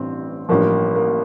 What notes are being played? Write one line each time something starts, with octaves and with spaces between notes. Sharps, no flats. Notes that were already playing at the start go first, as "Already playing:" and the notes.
Already playing: A1 G2 E3 C4
A1 G2 F3 A#3
A#3